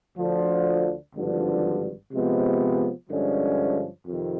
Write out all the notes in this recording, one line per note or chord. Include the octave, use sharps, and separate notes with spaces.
D2 D3 F3
G#1 G2 D3 F3
C3 F3 G#3 B3
G2 D3 F3 G#3 C#4
F2 C3 D#3